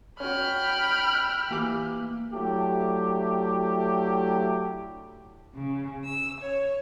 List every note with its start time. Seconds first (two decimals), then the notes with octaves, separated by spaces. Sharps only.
0.20 C#4 F#4 G5 B5 F6
1.51 E3 A#3 G4 D6
2.33 F#3 A3 D4 E4 G4
5.53 C#3
6.04 E6
6.41 C#5